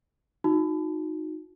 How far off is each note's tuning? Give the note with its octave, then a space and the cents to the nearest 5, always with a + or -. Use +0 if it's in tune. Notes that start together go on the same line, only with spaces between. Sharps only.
D#4 +0 F#4 -30